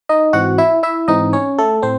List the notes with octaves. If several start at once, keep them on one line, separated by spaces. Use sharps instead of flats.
D#4 D#5
G#2 E3 C4 F#4 F#5
E4 E5
E4 E5
G#2 E3 C4 D#4 D#5
C#4 C#5
A3 A4
A2 C4 C5